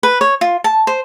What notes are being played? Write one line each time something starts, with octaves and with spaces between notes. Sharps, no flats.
B4
C#5
F4
A5
C5